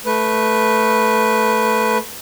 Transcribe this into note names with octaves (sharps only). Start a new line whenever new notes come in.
A3 B4